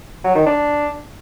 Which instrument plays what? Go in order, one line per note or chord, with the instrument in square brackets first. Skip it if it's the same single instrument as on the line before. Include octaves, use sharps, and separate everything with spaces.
[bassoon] F#3
D#3
D4